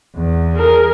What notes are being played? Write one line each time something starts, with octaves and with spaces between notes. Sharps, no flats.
E2
G#4 A#4